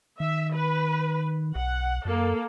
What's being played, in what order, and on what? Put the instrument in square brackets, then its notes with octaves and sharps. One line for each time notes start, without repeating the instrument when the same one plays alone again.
[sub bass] D#3 [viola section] E5
[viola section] B4
[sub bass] B1 [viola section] F#5
[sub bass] F#2 [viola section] A#3 A4